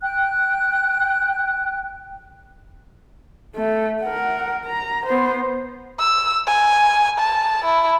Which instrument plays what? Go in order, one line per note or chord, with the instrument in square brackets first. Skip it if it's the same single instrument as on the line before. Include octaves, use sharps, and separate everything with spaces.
[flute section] G5 F#6
[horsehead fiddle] A3
A#4 F#5
A#5
B3 C5
[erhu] E6
G#5
A5
E4